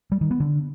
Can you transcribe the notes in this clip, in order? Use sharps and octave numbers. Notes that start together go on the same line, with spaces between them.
G3
D#3
B3
D3